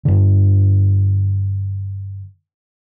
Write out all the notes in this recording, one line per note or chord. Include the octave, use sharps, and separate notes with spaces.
G2 D3